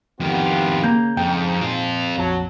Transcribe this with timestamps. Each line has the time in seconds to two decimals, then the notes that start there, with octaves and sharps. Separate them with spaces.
0.20 F2 D#3 B3 F4 G4
0.84 C#3 A#3 A#5 G6
1.17 F2 G#2 G5
1.61 A#2 C4 F4
2.17 A#1 F2 F#3 A5